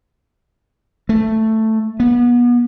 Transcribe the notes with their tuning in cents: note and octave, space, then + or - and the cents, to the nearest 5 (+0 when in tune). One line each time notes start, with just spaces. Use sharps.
A3 +5
B3 -30